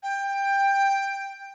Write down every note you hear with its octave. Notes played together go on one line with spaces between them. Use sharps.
G5